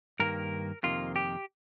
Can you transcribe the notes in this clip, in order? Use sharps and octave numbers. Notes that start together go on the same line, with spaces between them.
G2 D#3 A#3 A#4
F2 C3 D#3 A#3 F4
G4